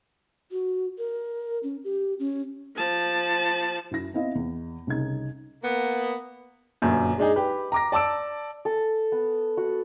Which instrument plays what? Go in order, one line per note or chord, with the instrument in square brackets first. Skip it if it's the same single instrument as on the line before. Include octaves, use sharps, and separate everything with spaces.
[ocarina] F#4
A#4
C#4
G4
C#4
[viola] F3 A5
[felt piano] F#2 E4 A#6
B3 C4 E4 D#5 F5
E2
C2 C#3 D#4 G#6
[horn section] A#3 B3
[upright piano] G1 F#2 A#2
G#3 D4 D#4 G#4
G4 B4
A#5 D6 A#6
D5 A5 D6 E6 D7
[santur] A4
B3
F#4